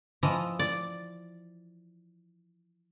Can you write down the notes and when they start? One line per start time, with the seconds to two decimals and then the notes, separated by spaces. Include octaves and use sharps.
0.23 E3 F3 D#5
0.59 D5